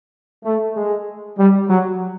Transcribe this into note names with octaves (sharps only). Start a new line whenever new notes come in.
A3
G#3
G3
F#3